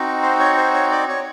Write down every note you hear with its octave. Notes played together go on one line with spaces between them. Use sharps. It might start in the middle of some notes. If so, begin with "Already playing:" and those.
Already playing: C4 D#4 F#4
C5
C#5
C5
C#5
D5
C#5